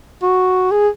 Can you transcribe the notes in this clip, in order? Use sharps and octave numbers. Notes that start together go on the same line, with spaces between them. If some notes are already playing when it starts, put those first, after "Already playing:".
F#4
G#4